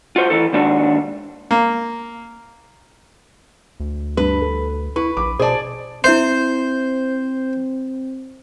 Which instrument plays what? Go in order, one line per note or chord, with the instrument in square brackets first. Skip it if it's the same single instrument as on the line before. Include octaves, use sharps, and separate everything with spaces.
[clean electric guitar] F4 F#4 C5
E3 E4 A4
D#2 G#2 D4 F#4
[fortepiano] A#3
[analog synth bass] D2
[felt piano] G2 [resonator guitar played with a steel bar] B4
[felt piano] A4
[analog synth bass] E4 [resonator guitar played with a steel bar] B4 [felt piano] C#6
[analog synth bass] A#1 [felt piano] B5 D6
[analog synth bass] B2 [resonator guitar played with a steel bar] G#4 D5 [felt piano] C5 A5
[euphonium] C4 [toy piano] E4 E5 C6 [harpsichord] C5